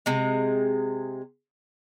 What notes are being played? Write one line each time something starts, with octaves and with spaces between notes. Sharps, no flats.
C3 G#3